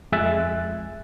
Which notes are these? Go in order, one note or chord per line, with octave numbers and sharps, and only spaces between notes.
F2 G#3 E5 G#5 F#6 A6